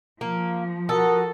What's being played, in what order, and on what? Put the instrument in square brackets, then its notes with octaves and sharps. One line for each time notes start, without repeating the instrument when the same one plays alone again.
[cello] F3 [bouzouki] A#3
[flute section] F#4 F#5 D#6 [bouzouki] A4 [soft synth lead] A#4